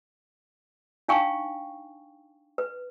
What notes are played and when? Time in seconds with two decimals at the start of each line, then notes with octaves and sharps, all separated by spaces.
1.09 D4 D#4 F5 G5 G#5 C#6
2.58 B4